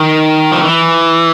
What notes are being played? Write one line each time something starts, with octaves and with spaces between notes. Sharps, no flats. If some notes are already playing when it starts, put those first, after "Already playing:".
Already playing: D#3
F3
E3